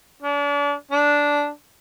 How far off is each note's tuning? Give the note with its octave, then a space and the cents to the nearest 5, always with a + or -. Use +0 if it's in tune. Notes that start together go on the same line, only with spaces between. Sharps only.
D4 -40
D4 -10